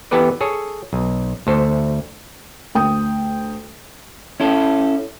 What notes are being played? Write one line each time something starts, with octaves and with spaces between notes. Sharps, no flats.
E3 B3 G4 A4 B4 D5
G#4 A4 C#5
B1
D2 A4 C5
D2 G5 D#6
C#4 E4 A4